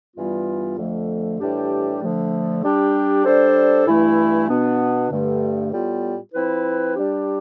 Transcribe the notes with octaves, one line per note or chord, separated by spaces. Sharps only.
G2 E3 G3 B3 F4
F2 D3 F3 A3
A2 E3 G3 D4 G4
D3 F3 A3
G3 D4 G4
G3 D4 A4 C5
G2 E3 A3 E4
B2 B3 D4
G2 D3 A3
A2 G3 B3 F4
F3 C4 E4 B4
G3 D4 G4